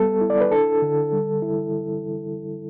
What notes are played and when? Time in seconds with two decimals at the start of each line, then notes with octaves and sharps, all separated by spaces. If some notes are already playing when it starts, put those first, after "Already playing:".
Already playing: G3 B3 A4
0.21 E4
0.30 D5
0.41 B4
0.52 D4 A4
0.82 D3
1.12 G3
1.42 E4